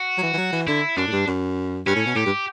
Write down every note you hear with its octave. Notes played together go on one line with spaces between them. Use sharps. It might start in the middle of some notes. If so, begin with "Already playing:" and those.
Already playing: F#4
F#3
E3
E3
F#3
E3
D3 E4
F#2 D4
A2
G2
F#2
G2 C#4
A2
B2
A2 G4
G2